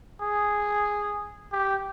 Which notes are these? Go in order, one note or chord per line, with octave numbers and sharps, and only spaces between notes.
G#4
G4